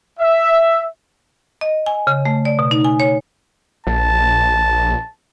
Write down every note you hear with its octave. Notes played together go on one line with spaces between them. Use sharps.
E5
D#5
G#5
C#3
A3
D5
B2
D#4
G#5
C#5
A#1 A5